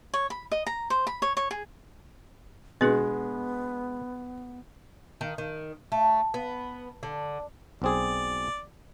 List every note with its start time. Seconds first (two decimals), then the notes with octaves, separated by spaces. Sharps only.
0.14 C#5
0.30 B5
0.52 D#5
0.67 A#5
0.90 C5
1.07 B5
1.22 C#5
1.37 C#5
1.51 G#4
2.81 B2 G#3 B3 D4 G#4 B4
5.21 D#3
5.38 D#3
5.92 A3
6.34 B3
7.03 D3
7.82 B1 C4 G#4 D5